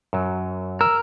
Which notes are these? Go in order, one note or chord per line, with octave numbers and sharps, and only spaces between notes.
F#2 F#3
A#4 E6